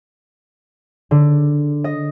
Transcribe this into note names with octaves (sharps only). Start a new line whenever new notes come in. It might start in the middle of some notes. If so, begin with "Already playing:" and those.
D3
D#5